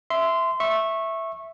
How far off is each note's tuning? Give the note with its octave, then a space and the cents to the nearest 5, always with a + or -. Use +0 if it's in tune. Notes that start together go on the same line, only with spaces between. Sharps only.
E5 +0 C6 -15
E5 +0 C#6 -20